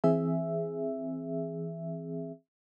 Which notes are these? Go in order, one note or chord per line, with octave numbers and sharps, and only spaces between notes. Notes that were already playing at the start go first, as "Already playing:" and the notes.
E3 C4 G#4 E5